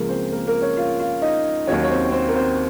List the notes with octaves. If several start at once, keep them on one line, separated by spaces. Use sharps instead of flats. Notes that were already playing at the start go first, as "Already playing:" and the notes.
Already playing: C#2 C#3 F3 A#3 A#4
C4 C5
A#3 A#4
A#3 A#4
C#4 C#5
F4 F5
F4 F5
D#4 D#5
D#2 D#3 F#3 C#4 C#5
C#5
C4 C5
C4 C5
A#4
C4 C5